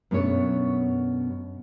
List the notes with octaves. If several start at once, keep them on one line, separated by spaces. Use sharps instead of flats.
F#2 B2 A3 D4 C#5